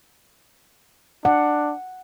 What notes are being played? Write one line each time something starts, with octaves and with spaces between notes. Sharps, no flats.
D4 F#5